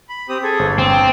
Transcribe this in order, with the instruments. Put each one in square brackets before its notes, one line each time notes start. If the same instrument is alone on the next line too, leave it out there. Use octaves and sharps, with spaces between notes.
[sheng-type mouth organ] B5
C4 G4 D#6
G#4 A4
[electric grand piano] G1 C5
[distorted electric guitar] C4 [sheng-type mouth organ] A5